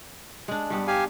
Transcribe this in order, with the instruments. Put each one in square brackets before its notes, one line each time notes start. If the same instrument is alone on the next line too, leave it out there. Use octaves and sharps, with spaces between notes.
[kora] G#3 D4
G2 G3 B3
[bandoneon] G4 F5 G#5